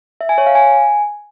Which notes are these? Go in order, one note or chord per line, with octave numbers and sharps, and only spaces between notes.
E5
G#5
C#5
F5
G#5